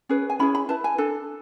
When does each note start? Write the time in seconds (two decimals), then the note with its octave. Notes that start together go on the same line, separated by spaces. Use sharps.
0.09 C#4 G#4 B4
0.30 G#5
0.39 C#4 E4 G#4 B5
0.55 B5
0.69 E4 B4 A5
0.84 G#5
0.98 D4 A4